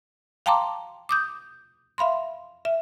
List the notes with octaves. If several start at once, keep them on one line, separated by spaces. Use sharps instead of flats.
F5 G5 A5 A#5 C6 D6
D6 D#6 G6
E5 F5 B5 C6
E5